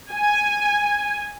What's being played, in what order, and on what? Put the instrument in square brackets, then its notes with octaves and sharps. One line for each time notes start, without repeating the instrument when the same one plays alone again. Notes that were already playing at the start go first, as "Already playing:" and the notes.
[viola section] G#5